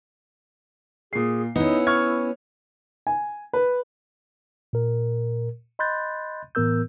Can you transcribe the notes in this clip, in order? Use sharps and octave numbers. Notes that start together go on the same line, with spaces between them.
A#2 G#4 C7
B3 C#4 D#4 E4
C#6 F6 G#6
G#5
B4
A#2 A#4
D#5 B5 C6 F#6 G6 A6
A2 E3 B3 A#4 E6 G6